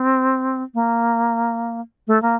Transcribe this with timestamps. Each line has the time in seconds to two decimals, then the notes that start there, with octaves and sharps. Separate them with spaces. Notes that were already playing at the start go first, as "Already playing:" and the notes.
Already playing: C4
0.74 A#3
2.08 A3
2.22 A#3